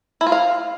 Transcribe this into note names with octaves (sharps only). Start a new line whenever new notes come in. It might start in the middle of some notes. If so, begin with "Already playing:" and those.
E4
F4
F5